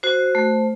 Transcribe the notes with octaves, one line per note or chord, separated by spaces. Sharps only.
F#4 C5
A3